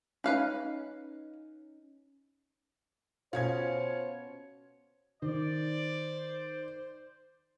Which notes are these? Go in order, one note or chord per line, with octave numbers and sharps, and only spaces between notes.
C#4 D#4 B4 F5 B5
B2 C#4 F4 C5 C#5 G#6
D#3 C5 D5